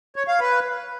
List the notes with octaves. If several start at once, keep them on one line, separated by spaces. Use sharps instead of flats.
C#5
F5
B4